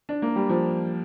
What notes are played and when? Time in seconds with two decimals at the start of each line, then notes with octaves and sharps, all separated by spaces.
0.09 D4
0.22 A#3
0.36 G3
0.49 F3